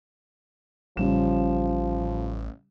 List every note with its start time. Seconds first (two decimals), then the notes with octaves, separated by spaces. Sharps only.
0.97 A1 C#3 F3 G3 E7